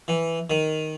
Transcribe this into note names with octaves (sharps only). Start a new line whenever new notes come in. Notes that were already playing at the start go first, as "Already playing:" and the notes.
E3
D#3